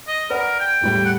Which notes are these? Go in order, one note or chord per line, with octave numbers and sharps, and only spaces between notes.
D#5
A#4 B4 D5 F#5
G5
E1 A2 G3
F#5